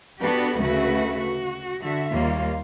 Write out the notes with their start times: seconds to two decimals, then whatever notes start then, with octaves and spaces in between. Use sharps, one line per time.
0.21 B3 D4 F#4 G4 A4 B4
0.59 D2 C#3 A3 F#4 B4 E5
1.18 F#4
1.81 D3 F#4 E5
2.12 D#2 G3 A#3 F4